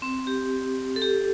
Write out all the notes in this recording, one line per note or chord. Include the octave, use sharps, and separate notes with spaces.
C4
G4
A4
G4